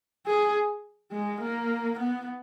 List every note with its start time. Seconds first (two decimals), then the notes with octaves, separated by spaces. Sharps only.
0.26 G#4
1.12 G#3
1.41 A#3
1.99 B3